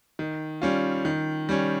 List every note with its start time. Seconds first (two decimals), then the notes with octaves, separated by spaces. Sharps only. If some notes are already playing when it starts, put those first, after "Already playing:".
0.19 D#3
0.62 G3 C#4 F4
1.05 D#3
1.49 G3 C#4